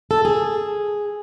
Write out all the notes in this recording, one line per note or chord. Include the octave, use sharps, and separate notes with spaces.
A4
G#4